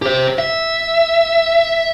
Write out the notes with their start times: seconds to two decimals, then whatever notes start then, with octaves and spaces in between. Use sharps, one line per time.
0.02 G4 C5
0.38 E5